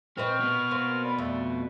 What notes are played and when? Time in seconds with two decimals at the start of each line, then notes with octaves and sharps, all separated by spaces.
0.17 A#2 C4 B4 D#5 C#6 F6
0.40 B2 B3
0.71 A#3 C4
1.04 D5 B5
1.18 F2 A3 D5